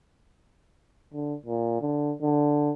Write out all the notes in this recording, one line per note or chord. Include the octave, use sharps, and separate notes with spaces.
D3
A#2
D3
D3